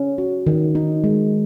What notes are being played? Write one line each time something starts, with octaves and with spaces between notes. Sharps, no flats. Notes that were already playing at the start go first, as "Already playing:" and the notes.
Already playing: C#4
F#4
D#3
D#4
G#3